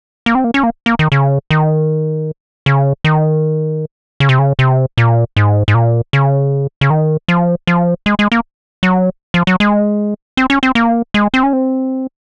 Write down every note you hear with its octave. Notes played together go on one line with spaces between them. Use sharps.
A#3
C4
A#3
C#4
A#3
A#3
D#3
C#3
D#3
C#3
D#3
C#3
C3
C#3
C3
A#2
G#2
G#2
A#2
C#3
C#3
D#3
F3
F3
G#3
G#3
A#3
F#3
F3
F#3
G#3
C4
C#4
C4
A#3
G#3
C4
C#4
C4